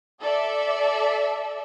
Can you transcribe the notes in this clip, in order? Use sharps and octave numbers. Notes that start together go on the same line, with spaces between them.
A4 D5 E5